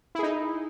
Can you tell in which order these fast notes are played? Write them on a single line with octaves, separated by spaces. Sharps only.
E4 G#4 D#4